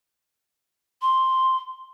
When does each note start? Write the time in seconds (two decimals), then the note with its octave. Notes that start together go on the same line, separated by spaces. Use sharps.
1.02 C6